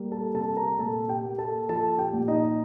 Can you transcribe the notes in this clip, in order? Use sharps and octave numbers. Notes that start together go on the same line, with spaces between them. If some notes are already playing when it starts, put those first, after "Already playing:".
Already playing: G3 A#3
A4 A5
C3 A4 A5
A#4 A#5
A#2 A4 A5
G4 G5
A#3
A4 A5
F3 A4 A5
G4 G5
A#2
D#4 D#5